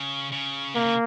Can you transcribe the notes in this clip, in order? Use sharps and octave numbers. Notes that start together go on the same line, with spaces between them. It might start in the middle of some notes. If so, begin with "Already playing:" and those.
Already playing: C#3
C#3
C3 A#3
C#3